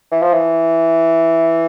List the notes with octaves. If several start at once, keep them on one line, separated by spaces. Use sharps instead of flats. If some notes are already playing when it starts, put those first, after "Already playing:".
E3
F3
E3